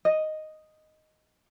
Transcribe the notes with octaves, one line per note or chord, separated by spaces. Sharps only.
D#5